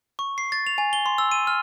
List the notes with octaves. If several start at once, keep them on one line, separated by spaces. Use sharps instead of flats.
C#6
C7
A6
F7
G#5
G7
C6
E6
D#7
F6